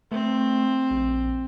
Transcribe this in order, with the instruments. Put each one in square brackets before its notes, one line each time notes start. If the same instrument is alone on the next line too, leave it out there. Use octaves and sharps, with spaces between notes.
[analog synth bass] A3 [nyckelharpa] C4
[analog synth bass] A#1